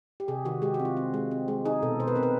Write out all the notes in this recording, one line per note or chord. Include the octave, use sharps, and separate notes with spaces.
G4
C3 G#4
D#3 F#4
G#3 G4
F#4
C4
F4
C4
G#3
C4
G#3
D#4 G#4
B2 A4
B2 C5
B4
C4 A#4
B4